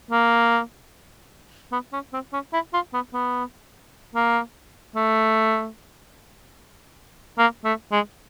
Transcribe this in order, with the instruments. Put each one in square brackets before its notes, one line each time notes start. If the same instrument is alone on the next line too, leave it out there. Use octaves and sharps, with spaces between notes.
[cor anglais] A#3
B3
C#4
C4
C#4
E4
F4
B3
B3
A#3
A3
A#3
A3
G#3